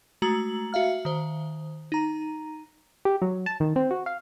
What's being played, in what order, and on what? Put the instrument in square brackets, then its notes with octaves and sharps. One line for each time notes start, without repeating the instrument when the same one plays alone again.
[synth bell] G#3 A3 F#4 A#5 E6 F#7
F#4 E5 F5 F6
D#3 C5
D#4 A#5
[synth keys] G4
F#3
A5
D#3
C4
F#4
F5